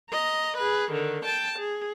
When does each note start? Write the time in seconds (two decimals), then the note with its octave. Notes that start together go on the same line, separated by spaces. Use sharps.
0.10 D#5 A#5
0.58 G#4 B4
0.92 D3 D#3
1.25 G5 A5
1.59 G#4